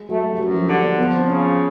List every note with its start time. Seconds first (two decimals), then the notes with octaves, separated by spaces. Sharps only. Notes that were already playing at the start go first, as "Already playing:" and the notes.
Already playing: G#3
0.08 F#3 A3
0.32 G3
0.38 F#2 F#3
0.54 F3
0.68 D3 G3
0.83 A#3
0.98 F3 B3
1.17 C4
1.28 C#3 C#4